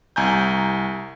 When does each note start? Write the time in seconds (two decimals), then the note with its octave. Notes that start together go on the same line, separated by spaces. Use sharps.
0.16 C2 G#5 A#5 G6